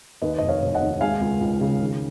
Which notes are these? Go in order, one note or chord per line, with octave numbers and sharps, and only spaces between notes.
D#2 B4 D#5
F1 D#5
C#5 F5
F1
D#5 F#5
D#2
G#3 F5 G#5
C#2
C#2
C#3
D#3